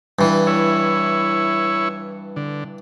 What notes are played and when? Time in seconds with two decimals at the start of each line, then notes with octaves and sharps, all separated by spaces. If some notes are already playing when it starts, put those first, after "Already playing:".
0.19 G2 E3
0.47 E4 C#5
2.36 D3